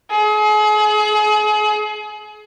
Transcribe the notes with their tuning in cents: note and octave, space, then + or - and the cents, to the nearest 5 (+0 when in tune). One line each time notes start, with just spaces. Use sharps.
G#4 +35